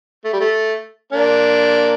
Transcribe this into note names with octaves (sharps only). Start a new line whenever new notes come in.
A3
G3
A3
A#3 D4